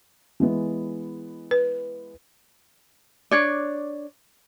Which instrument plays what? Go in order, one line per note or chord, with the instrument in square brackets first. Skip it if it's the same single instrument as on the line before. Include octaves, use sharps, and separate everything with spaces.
[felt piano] E3 G#3 B3
[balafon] B4
[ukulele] D4 C#5 D5